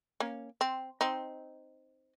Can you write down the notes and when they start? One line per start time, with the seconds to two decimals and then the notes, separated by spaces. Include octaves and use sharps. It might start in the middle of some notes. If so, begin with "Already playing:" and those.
0.20 A#3 C#4
0.61 C4
1.01 C4 D#4